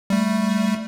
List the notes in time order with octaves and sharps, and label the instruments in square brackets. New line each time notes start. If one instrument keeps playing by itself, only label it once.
[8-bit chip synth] G3 A3